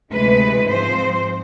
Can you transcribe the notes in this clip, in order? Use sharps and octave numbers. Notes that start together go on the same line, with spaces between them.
D2 C3 E3 G#3 B4
G#2 F3 G#3 C4 C5